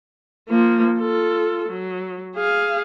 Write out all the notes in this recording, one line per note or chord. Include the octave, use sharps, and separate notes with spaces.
F3 A#3
F4 A4
F#3
G#4 F5